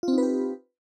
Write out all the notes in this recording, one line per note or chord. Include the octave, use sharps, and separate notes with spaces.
C4 D#4 F4 G4 B4